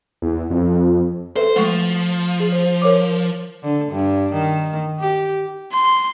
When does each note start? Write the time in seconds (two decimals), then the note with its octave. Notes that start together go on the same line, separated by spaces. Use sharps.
0.22 E2
0.50 F2
1.36 A4 B4 C5 E5
1.56 F3 G#3 A3 C#6
2.40 G#4
2.52 C5
2.82 A#4 C#5 D6
3.63 D3
3.92 G2
4.32 D#3
4.99 G4
5.72 C6